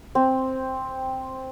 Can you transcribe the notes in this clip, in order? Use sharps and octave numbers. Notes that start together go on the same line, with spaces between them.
C4